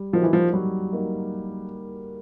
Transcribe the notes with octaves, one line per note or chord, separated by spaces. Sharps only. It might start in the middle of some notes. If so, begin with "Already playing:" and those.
Already playing: G3
F3 A#3 D#4 F#4
E3
F3
F#3 G3
A#3 D#4 F#4